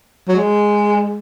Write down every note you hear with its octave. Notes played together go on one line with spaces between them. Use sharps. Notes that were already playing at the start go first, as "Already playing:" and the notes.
F#3
G#3